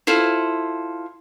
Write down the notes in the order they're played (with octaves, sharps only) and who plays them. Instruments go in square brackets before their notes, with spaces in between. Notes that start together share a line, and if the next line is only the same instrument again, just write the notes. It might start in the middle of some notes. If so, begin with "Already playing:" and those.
[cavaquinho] E4 F4 A4 C5